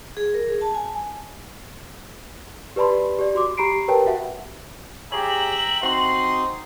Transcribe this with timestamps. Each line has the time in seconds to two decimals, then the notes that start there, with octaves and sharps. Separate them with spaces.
0.17 G#4
0.34 A#4
0.49 G#4
0.61 A5
0.75 G#5
2.76 G4 B4 D5 A5 B5 C6
3.19 G4 D5
3.35 F#4 C6 D6
3.57 G4 A#5 B5 C7 D7
3.88 G4 A#4 B4 C#5 G5 A5
4.06 F#4 E5 F#5
5.12 G4 G#4 C#5 E5 G5 A#5 F#7
5.83 C4 D#4 F#4 C6